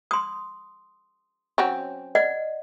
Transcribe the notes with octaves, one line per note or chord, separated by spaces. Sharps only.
C6 D#6
F#3 C4 C#4
D5 D#5 F#5